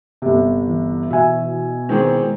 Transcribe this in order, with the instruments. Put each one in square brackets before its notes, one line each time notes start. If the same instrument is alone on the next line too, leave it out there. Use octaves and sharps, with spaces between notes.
[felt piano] G1 C3
[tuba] E3
[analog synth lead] B2 [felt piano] E5 G#5
[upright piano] D#3 E3 C4 [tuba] G#3